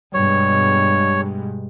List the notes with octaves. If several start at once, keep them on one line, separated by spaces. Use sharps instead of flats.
G2 B2 G#3 C#5